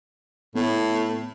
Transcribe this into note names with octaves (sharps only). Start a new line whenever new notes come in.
A2 B3